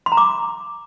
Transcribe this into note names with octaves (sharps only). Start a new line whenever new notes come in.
C6
A#5
D6